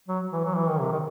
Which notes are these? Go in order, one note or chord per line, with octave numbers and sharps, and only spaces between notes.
F#3
E3
F#3
E3
D#3
C3
D#3